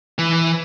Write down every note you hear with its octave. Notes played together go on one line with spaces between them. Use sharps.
E3